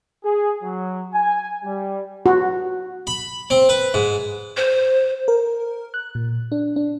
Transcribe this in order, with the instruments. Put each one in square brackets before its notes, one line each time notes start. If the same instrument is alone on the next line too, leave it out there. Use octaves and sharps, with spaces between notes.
[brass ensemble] G#4
F#3
G#5
G3
[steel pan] F#4
[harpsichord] B5
C4
B4
G#2
[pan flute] C5
[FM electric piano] A#4
F#6
A#2
D4
D4